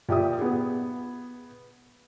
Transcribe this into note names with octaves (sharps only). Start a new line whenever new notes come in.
A#2 G4 E5 D#6
B3 G#4